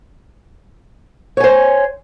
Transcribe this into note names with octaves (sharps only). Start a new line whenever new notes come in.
C5 C#5 G#5